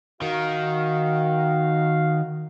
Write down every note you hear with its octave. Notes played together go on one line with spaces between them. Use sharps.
D#3 F#4 F5